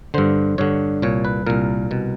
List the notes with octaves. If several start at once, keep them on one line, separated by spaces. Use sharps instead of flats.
G2 D3 C5
G2 D3 C#5
C2 A#2 C#5
B4
C2 A#2 A#4
C2 B2